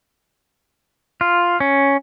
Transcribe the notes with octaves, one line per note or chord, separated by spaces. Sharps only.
F4
C#4